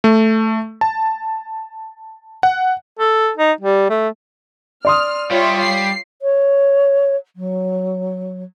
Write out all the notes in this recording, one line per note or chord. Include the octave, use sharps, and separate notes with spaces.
A3
A5
F#5
A4
D#4
G3
A3
D5 C6 D#6 F6
G3 F4 C#5 E5
C7
C#5
F#3